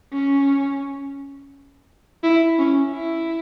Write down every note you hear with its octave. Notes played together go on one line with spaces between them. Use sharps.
C#4
E4
C#4
E4